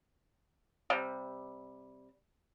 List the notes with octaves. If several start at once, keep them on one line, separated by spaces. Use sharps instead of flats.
C3 G3